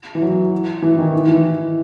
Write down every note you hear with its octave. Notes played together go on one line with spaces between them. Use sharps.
E3
F#3
E3
D#3
E3
E3